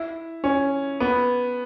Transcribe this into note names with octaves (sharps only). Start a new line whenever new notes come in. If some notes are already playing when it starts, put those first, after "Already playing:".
Already playing: E4
C#4
B3